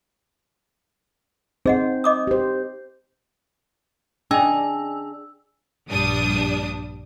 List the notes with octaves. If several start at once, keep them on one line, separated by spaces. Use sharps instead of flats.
C4 D#4 G#4 C5 D#5 F#5
D#5 D6 D#6
G4 C5
C#4 D4 G#4 D#5 G5 G#5 E6
A#1 G2 G3 D4 D#6